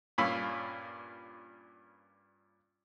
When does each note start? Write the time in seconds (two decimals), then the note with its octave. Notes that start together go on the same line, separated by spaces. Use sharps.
0.18 G2 A#2 C#4 F5 B5 E6